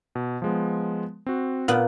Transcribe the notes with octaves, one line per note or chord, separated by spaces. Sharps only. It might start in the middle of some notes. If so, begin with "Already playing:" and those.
B2
F3 G#3 B3
C4 F#4
A#2 B3